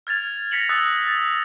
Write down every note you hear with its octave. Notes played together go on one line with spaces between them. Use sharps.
F6 G#6 A6 F7
G#6 A#6 B6 C#7 F7 F#7
D#6 E6 F#6 A6
A6